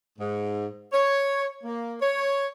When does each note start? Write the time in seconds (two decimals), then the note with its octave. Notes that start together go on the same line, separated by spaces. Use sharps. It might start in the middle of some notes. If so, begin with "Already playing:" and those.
0.19 G#2
0.93 C#5
1.64 A#3
2.01 C#5